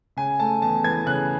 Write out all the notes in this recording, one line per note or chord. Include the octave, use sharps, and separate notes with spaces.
C#3 G#5
A3 A5
E2 A5
E3 G#6
C#3 F#6